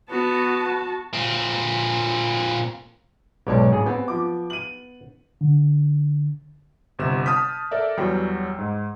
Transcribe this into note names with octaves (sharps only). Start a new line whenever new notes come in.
B3 F#4 A5
A#2 C4
B1 G#2 C#5 D5 A5
A1 G#4
B3 C4
F3 D6
D#7 F#7
D3
G1 C3 E7
A5 D#6 F6 G6 B6
A4 A#4 D5 E5
E2 F#3 G3 G5
G#2